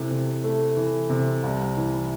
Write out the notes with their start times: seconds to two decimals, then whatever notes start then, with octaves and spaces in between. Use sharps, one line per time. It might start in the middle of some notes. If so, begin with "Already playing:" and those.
Already playing: C3 E3 A3
0.11 C3
0.44 A3
0.77 E3
1.09 C3
1.43 C2
1.77 E3